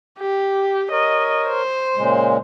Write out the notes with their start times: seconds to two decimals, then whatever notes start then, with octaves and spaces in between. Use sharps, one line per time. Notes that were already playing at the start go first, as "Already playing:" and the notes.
0.19 G4
0.91 A#4 C#5 D#5
1.48 C5
1.96 A#2 C#3 G#3